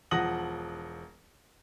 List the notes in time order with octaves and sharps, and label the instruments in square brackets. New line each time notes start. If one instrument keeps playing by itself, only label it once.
[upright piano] E1 F3 F#5 D#6 A#6 F#7